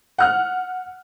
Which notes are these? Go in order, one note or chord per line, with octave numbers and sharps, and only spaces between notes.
F#5 F6 F#6